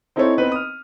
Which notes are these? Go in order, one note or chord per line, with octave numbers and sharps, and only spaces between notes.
C4 D#4 E4 A4 C5 C#5
B3 C4 D#4 B4
D#6 F6